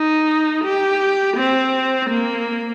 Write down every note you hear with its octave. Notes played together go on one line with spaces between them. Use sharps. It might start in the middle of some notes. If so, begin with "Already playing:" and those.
Already playing: D#4
G4
C4
A#3